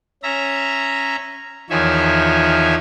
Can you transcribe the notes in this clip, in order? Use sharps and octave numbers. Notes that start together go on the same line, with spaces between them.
C#4 E5 A#5
E2 D#3 F3 C#5 E5 G#5